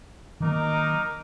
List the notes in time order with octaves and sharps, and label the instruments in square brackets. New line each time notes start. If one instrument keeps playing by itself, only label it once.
[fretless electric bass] D#3 F#3 A#3 [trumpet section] D#4 A#4 D6